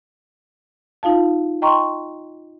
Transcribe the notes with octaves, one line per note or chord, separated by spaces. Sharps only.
D#4 F4 F5 A5
D#5 G5 A#5 C6 C#6